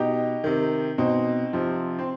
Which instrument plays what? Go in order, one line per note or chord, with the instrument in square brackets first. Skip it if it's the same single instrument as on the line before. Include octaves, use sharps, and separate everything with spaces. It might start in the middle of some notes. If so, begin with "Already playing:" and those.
Already playing: [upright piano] B2 D#4 G4
C3 D#3
B2 C4 D#4
C3 F3
C4